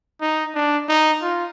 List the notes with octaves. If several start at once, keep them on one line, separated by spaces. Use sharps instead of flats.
D#4
D4
D#4
F4